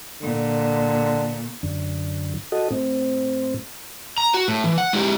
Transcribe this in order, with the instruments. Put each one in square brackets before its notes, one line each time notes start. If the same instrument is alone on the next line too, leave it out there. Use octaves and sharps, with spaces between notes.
[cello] A#2 [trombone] D3
[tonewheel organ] F#2 D3
F#4 A4 D#5
A2 C4
[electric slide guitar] A#5
F#4
A2
E3
F#5
G#3 E4 G4